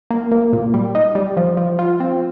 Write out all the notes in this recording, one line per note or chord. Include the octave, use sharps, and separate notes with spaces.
A#3
A#3
A#2
G3
D#4
G3
F3
F3
F4
C4